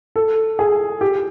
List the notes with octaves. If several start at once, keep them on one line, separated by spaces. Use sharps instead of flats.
A4
G#4
G4